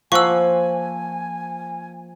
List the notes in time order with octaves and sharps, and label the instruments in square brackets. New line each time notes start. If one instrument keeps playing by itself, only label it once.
[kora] F3 A#3 [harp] C5 F#5 F#6 [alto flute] G#5 [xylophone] C#6 E6